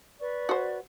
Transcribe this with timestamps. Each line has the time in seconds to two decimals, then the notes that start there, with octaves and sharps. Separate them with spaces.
0.20 B4 D5 C#6
0.49 F#4 C5